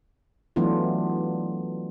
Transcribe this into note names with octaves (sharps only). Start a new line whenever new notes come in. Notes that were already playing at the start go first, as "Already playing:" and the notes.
E3 F#3 A3 B3 D4 F4